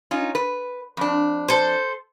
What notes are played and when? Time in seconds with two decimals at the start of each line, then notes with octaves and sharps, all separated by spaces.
0.11 C#4 D#4 F4
0.35 B4
0.97 F2 D4
1.49 A4 C5